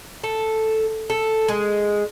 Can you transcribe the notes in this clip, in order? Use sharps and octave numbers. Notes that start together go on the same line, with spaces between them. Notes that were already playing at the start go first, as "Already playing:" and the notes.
A4
A4
G#3